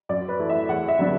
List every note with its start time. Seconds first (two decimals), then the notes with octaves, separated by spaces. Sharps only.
0.09 F#2 D5
0.28 B4
0.39 E3 A3 E4
0.49 E5
0.69 E2 F#5
0.88 E5
0.99 D3 F#3 B3 D4